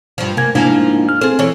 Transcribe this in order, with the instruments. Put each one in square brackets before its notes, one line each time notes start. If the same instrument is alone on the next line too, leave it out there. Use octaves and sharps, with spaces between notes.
[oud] G2 F3
[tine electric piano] C3 G#5 G#6 [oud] A#3
[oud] G#2 F3 A#3 [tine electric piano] D4 E4 G#5
[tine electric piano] F6
[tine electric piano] C4 A4 [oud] G#4 C5
[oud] E3 C#5